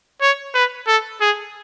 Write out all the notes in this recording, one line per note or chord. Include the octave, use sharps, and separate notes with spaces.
C#5
B4
A4
G#4